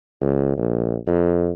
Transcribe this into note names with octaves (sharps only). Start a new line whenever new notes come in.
C#2
A#1
F2